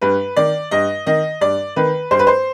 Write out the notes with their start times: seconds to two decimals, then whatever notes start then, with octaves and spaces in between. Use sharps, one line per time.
0.02 G2 B4
0.36 D#3 D5
0.71 G2 D#5
1.07 D#3 D#5
1.41 G2 D5
1.76 D#3 B4
2.11 G2 C5
2.19 B4
2.27 C5